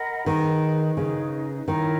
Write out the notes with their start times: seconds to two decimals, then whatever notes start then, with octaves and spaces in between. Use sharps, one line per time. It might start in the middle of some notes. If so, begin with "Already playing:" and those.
Already playing: A#4 D#5 F#5 B5
0.26 D#3 D#4 G#4 B4
0.97 C#3 D#4 G#4 B4
1.68 D#3 E4 A#4 C#5